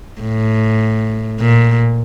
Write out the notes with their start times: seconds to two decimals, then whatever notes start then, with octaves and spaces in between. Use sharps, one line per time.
0.21 A2
1.40 A#2